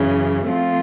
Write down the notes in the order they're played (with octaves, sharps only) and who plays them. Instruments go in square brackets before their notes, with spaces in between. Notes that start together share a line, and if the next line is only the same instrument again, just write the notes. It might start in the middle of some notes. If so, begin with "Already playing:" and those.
Already playing: [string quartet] F#2 C#3 E3
F3 A3 C4 F4